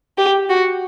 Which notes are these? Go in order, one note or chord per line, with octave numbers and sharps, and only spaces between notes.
G4
F#4